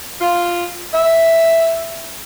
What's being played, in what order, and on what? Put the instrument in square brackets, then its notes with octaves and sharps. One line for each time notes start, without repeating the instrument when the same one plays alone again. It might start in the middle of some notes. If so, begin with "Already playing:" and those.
[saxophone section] F4
E5